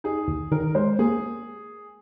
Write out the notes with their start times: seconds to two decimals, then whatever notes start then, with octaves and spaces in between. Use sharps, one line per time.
0.04 D#4 G#4
0.28 D#2
0.52 D#3 A#4
0.75 G#3 C5
0.99 A#3 G#4